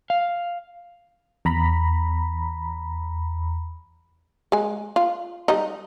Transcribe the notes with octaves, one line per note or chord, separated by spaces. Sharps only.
F5
E2 A#5 B5
G#3 G#5
F4
G3 D#4